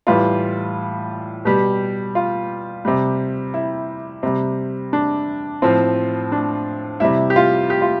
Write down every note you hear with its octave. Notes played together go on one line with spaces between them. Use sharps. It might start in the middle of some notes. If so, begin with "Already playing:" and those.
A2 E3 G3 F4
B2 G3 G4
F4
C3 G3
E4
C3 G3
D4
A2 F3 C4
D4
C3 G3 E4
G4
F4
G4
F4